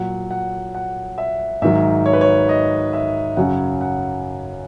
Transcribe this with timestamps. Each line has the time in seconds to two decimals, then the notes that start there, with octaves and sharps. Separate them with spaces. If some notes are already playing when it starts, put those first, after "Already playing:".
Already playing: A#2 F#3 F#5
0.31 F#5
0.74 F#5
1.18 E5
1.62 G#2 D#3 F#3 E5
2.06 C#5
2.13 B4
2.21 C#5
2.49 D#5
2.93 E5
3.37 F#2 C#3 F#3 F#5
3.81 F#5